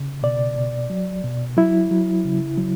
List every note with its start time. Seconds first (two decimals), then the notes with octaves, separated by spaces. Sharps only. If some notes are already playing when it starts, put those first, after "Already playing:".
Already playing: C#3
0.23 B2 D5
0.56 B2
0.90 F#3
1.24 B2
1.57 F#3 E4
1.91 F#3
2.25 C#3
2.58 F#3